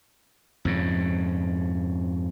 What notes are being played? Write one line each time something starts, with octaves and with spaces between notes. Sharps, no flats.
F2 G#2 C#3